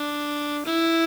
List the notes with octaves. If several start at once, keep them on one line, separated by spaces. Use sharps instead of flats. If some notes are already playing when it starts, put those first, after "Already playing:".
Already playing: D4
E4